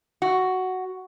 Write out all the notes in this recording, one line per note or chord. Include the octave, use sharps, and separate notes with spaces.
F#4